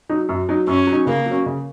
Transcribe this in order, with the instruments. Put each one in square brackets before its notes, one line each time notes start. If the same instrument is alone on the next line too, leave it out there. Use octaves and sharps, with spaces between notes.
[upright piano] F#3 D#4
F#2
F#3 D#4
[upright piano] F#2 [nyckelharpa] C#4
[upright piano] F#3
D#4
[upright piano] C#3 [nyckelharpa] A#3
[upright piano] F#3
C#4
C#3